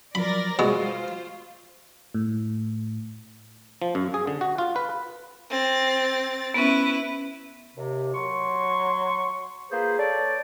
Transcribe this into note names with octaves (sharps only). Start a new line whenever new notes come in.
F3 F#3 A#4 D5 B5 A#6
B2 G#3 F4 C5 C#6
A2
F3
F#2
G#4
D3
F#4
F4
B4
C4 A6
B3 C#4 E4 B4
D#2 C3
F#3 C6 C#6
A#3 F4 G#4 B4 C5
A4 C#5 D5